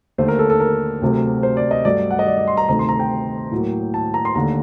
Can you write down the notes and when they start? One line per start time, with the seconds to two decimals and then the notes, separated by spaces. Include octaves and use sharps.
0.18 D#2 D3 A3 C5
0.28 A#4
0.39 A4
0.50 A4
0.60 A#4
1.02 D2 C3 F#3 A3
1.43 C5
1.57 D5
1.71 D#5
1.85 G2 F#3 A3 D5
2.11 F#5
2.19 D#5
2.27 D5
2.37 D5
2.48 C6
2.57 A#5
2.69 D2 C3 D#3 A3 A#5
2.79 C6
2.89 A#5
3.00 G5
3.52 A2 F#3 A#3
3.94 A5
4.14 A#5
4.25 C6
4.35 D#2 D3 A3 A#5